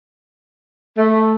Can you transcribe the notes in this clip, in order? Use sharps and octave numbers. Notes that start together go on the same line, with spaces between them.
A3